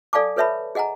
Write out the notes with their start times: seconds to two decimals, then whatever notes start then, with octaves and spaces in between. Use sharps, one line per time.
0.13 A4 D5 F5 G#5 A5 D6
0.37 A4 B4 C#5 E5 A5 B5
0.75 G#4 D#5 F#5 G#5 A#5